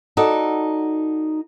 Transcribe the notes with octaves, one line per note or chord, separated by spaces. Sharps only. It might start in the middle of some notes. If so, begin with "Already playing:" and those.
D#4 F#4 A4 D5